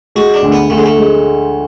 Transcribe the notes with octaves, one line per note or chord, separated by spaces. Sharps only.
G#3 F#4
D4
D2
B3
D2 A3
G#3
A3
G#3